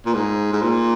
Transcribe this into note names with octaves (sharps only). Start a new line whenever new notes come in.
A#2
G#2
G#2
A#2